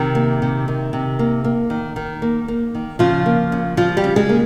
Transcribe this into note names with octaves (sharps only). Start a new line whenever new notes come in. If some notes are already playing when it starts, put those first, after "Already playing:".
Already playing: C3 D#3 D#4
A#3
C3
D#3
C3
A#3
A#3
D#3
D#3
A#3
A#3
D#3
C#3 F3 F4
A#3
C#3
F3 G3 F4
G3 G4
C#3
G#3 G#4
A#3